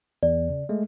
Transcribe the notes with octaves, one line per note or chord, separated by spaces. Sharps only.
E2 D5
C#3
G#3 A3